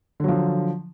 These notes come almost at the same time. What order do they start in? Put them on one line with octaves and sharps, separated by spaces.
D3 F#3 F3